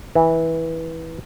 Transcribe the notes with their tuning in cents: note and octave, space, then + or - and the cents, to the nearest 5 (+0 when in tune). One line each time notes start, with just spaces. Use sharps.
E3 -15